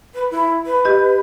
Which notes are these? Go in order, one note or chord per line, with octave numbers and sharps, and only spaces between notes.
B4
E4
B4
G4 D#5